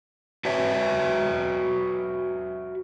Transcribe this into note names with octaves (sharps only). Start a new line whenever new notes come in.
F#4 B4 C#5 E5